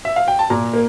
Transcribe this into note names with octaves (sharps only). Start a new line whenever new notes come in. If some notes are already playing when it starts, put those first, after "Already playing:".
E5
F5
G5
A5
A#2 A#5
A#3